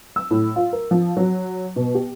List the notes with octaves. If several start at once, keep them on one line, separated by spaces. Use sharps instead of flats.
E6
A2
F4
A#4
F3
F#3
B2
G4